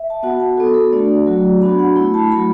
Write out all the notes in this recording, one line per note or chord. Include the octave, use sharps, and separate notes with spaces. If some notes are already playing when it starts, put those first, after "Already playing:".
Already playing: E5
A5
B3 F#4 F#5
A5
B3 F#4 A4
A4
A3 D4 F#4 D5
F#3 A3 F#4
B3 D4 F#4 B5
F#5
A3 E4 B5
A5
F#3 A3 F#4 B5